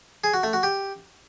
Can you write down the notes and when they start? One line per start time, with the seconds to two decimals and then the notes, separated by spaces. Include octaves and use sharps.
0.24 G#4
0.34 F#4
0.43 A3
0.53 F#4
0.63 G4